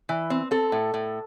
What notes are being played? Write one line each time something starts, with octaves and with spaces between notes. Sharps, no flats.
E3
C4
C4 A4
A2
A2